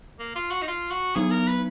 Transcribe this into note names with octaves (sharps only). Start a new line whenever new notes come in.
A#3
F4
F#4
D#4
F4
F#4
F#3 B3 D#4 G#4
A#4
B4